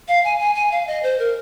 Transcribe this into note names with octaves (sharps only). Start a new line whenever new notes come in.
F5
G#5
G#5
G#5
F5
D#5
C5
A#4